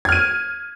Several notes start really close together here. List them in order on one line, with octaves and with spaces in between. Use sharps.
G#6 F6 D#7